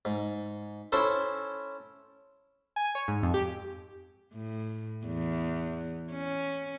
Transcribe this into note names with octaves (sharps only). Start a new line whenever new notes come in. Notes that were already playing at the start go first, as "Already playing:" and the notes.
G#2
C#4 E4 A4 C5
G#5
C#5
G#2
F2
G4
A2
E2
C#4